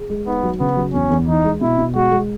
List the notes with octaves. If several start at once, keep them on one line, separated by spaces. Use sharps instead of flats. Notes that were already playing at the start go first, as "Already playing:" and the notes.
Already playing: G#4
G#3
B3 D#4
F#3
C#3 B3
F#3
E2 C#4
E2
E3 D#4
G#3
B2 E4
B2
G#3 F#4
G#3